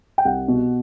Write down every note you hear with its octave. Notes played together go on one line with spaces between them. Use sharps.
G5
C2 F#5
B2